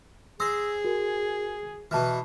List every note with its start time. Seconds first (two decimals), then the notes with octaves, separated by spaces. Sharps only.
0.40 G#4 C5 D#6 E6 A#6
0.85 F#4 A#4
1.91 B2 E3 A5 F6